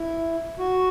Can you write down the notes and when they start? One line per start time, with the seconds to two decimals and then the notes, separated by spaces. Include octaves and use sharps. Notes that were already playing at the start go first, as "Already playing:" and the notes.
Already playing: E4
0.59 F#4